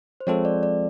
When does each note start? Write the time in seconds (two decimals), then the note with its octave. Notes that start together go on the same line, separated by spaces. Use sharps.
0.20 C5
0.27 F3 G#3 C4 F4 A4 C#5
0.45 D5
0.63 D5